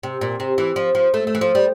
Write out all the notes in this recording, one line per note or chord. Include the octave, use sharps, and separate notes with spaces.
C3
A#2
C3
E3
F3
F3
A3
A3
E3
F3
G3